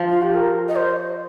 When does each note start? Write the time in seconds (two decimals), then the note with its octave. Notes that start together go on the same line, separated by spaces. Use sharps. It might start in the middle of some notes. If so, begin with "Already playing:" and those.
Already playing: F3
0.10 F4
0.22 G4
0.35 A#4
0.68 D#5
0.76 C5